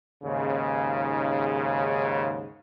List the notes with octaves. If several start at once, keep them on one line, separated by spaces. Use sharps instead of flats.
D#2 G#2 C#3